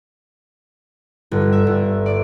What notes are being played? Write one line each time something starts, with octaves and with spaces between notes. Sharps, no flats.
G1
E5
G1
D5